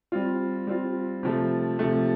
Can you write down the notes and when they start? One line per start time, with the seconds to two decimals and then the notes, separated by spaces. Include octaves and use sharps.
0.12 G3 C4 F4
0.67 G3 C4 F4
1.23 C3 F3 A3
1.79 C3 F3 A3